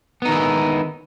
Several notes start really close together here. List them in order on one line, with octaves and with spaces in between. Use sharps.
B3 D#4 D#3 E4 G#3